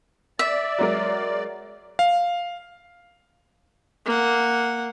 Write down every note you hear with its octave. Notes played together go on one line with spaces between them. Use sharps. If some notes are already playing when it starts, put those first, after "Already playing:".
D5 E5
F#3 G#3 A#4
F5
A#3 F#5